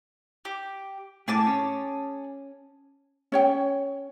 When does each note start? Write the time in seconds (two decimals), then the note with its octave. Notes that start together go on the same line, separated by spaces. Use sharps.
0.45 G4
1.28 A2 G#4 A5 D6
1.47 C#4
3.32 C#4 C#5 G5